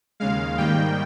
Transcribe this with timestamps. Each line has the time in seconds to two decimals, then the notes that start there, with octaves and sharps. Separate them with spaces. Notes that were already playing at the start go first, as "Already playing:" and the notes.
0.20 D#2 C#3 G#3 F5
0.58 G#2 D#3 G3 A#3 G5